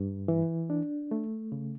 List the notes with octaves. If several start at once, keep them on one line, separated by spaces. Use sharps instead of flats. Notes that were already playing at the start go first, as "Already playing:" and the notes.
Already playing: G2
E3
D4
A3
C#3